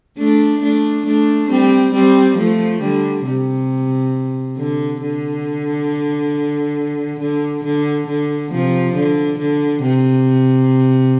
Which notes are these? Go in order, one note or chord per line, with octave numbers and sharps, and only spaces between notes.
A3 D4
A3 D4
A3 D4
G3 C4
G3 C4
F3 A3
D3 G3
C3
D3
D3
D3
D3
D3
C3 F3
D3
D3
C3